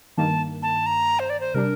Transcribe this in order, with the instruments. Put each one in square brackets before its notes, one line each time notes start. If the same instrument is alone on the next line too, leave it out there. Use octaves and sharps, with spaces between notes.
[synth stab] G2 D#3 A#3 [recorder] A5
[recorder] A5
A#5
C5
D5
C5
[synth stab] C3 G3 D4 [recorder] A#4